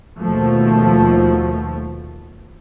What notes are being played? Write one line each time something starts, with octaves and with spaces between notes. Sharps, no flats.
D#2 B2 F3 A3